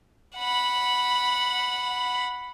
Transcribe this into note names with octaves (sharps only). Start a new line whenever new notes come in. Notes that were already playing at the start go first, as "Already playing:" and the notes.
F#5 B5